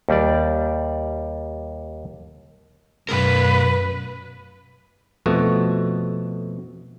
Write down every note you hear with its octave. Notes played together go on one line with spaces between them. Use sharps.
D#2 G3 D5
F#2 B2 A#4 B4
F2 B2 A3 F#4